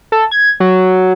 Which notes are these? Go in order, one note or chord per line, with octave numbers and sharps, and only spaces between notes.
A4
G#6
F#3